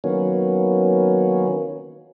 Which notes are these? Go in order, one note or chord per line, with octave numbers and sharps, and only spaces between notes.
D#3 F#3 A#3 B3 C#4